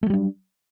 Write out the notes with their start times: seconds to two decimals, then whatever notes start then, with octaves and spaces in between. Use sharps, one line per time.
0.03 A3
0.06 F#3
0.10 G3
0.14 D4